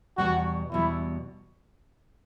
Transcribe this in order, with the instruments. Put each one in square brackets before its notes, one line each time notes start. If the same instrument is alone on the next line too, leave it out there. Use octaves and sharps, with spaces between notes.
[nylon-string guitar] E2 B2 G3 [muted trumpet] F#4
[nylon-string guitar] E2 B2 G3 [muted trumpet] E4